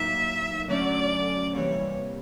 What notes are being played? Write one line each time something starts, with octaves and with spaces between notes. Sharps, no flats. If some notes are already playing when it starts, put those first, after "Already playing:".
Already playing: A2 F#3 A#3 D#4 E5
D3 F#3 A3 C#4 D5
C3 E3 G3 A#3 C#5